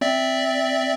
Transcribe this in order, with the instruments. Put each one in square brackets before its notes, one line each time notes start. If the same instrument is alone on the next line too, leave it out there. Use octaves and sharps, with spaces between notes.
[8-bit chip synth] C4 D5 E5